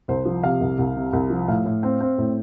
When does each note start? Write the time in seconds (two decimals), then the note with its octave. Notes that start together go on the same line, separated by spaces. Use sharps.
0.08 C2 C5
0.25 F3
0.43 C3 F5
0.61 C2
0.79 C2
0.96 C3
1.13 C2
1.30 F3
1.48 A2 F5
1.65 A2
1.83 C4
2.01 C4
2.18 A2